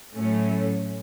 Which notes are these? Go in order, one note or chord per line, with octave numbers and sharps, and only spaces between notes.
A2 F#3 A3 C#4